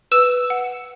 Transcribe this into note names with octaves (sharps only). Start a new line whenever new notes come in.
B4 E6 E7
F#5